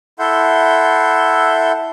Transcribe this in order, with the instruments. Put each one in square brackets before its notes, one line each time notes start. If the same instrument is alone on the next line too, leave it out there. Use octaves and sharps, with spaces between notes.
[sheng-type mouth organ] E4 A4 E5 F#5 C6 G6